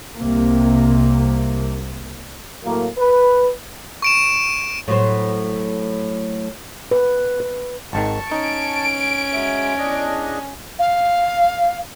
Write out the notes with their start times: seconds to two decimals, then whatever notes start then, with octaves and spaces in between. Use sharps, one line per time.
0.18 C2 C3 A#3
2.65 A2 F#3 A#3
2.98 B4
4.02 C#6 D7 E7
4.88 A2 F#3 C5
6.91 B4
7.40 B4
7.93 G#1 G#2 D#3 A5 C#6
8.32 C#4 D#4 G#5 D7
9.33 F#3 G#3 E5
9.78 E2 D4 D#5
10.79 F5